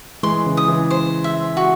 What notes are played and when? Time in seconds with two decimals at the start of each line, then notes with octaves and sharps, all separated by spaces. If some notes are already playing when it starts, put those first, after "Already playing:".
0.23 E3 G#3 C6
0.46 C#3 E3
0.57 D#6
0.68 C#3 E3
0.91 C5
1.24 E5
1.57 F#4